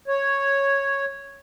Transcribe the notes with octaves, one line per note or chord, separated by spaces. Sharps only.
C#5